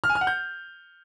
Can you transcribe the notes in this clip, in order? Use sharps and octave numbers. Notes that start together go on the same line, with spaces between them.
F6
G#5
F6
F#5
G6